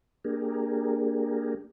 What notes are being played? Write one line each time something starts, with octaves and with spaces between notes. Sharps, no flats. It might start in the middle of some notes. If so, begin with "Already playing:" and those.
A#3 D4 G4 G#4 A#4